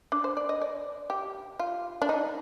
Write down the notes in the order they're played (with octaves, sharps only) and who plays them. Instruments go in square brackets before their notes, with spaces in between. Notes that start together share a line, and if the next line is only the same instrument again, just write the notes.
[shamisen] D4
C5
D5
D#5
D5
G4
F4
D4
D#4